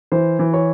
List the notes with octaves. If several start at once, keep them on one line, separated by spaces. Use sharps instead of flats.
E3 C5
E3
C#5